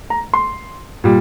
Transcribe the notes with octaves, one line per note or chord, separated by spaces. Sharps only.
A#5
C6
A#2 G3